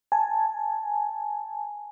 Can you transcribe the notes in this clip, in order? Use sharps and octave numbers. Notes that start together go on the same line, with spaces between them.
G#5 A5